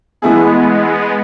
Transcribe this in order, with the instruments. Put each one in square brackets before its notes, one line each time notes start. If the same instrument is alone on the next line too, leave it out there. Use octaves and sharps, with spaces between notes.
[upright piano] E3 A3 E4 G#4 [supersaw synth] G#3 B3
[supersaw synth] G#3 B3